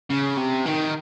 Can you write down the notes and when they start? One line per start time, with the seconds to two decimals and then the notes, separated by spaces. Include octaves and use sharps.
0.10 C#3
0.37 C3
0.66 D#3